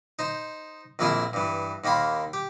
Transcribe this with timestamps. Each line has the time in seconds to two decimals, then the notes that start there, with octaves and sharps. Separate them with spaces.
0.19 D#4 C5
0.99 A#1 F2 A#3 E4 G#4 G#5
1.33 G2 E3
1.84 D#2 D#3 A#3 B5 C6
2.33 G4